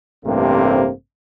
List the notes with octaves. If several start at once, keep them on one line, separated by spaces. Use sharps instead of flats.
A1 G2 C3 A3 A#3 C4